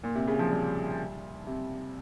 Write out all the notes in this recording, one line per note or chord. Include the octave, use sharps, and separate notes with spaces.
A#2
C3
C#3
F3
G3
C3